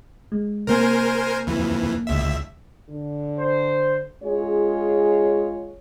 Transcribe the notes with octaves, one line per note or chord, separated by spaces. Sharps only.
G#3
C3 A#3 A#4 C5 G#5
F2 E3
C#2 E5
D3
C5
G#3 C#4 F4 G#4 C#5